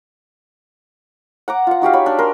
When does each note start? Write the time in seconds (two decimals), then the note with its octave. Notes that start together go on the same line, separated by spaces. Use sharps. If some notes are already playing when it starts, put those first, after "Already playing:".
1.48 F#5 A#5 D6
1.67 F4 F#5
1.82 D#4 F#4 G4 F5
1.93 C#5 B5
2.06 D4
2.19 A#4 C6